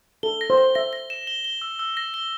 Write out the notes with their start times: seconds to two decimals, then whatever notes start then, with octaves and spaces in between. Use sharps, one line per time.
0.23 A4 G7
0.41 A#6
0.50 C5
0.58 A#6
0.75 E5 A#6
0.93 A#6
1.10 E7
1.27 G7
1.44 G7
1.62 E6
1.79 E6
1.97 A#6
2.14 G7